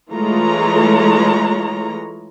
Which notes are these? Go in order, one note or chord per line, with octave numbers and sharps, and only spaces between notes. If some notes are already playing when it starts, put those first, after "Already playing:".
E3 G#3 A3 F4 C#5 A#5